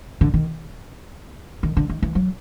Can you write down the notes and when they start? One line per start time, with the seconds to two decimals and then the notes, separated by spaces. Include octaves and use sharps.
0.21 D3
0.34 D#3
1.63 D#3
1.77 D3
1.90 D#3
2.02 E3
2.15 F#3